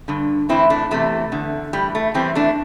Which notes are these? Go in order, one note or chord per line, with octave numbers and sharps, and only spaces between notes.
G2 D3
A2 E3 C4 E4
A3 D4
E2 C3 E3 A3
E2 D3
A2 E3 G3
A3
E2 E3 G3 C4
A3 D4